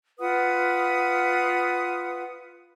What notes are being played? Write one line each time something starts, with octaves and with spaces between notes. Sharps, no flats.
F4 B4 F#5 D#6